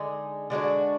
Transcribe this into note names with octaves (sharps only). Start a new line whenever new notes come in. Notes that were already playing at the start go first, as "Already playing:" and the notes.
Already playing: D3 G#3 D#4 G#4
D3 G#3 D4 F#4